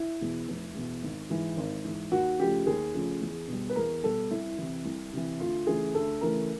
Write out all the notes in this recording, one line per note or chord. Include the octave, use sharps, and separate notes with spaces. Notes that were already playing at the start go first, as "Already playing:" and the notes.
Already playing: E4
E2 B2
F1
E2 B2
G#1
G#2 E3
G#1
G#2 E3
D#2 F#4
C#3 F3 A3 G4
D#2 G#4
C#3 F3 A3
E2
B2 G3
B4
E2 A#4
B2 G3 A4
C2 E4
C3 E3
C2
C3 E3
D2 F4
C#3 E3 A3 G#4
D2 A4
C#3 E3 A3 A#4